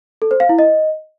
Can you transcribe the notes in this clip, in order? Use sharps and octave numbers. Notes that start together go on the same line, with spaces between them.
A4
C5
F5
E4
D#5